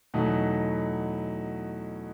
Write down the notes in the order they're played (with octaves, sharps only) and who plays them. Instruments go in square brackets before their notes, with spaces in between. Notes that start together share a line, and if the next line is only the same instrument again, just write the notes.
[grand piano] E2 B2 F#3 A3 D#4